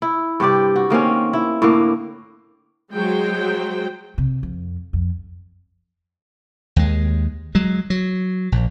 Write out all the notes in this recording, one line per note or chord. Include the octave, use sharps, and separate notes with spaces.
E4
G2 C3 G4 D5
F#4
D#3 A#3 C4 C#4
E4
A2 D3 A#3
F#3 G#3 C5 G5
C3
F2
F2
D#2 G#3
F#3 G#3
F#3
A#1